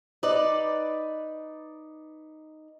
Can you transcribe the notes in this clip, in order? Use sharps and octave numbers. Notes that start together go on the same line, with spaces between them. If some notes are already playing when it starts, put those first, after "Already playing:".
D#4 B4 D5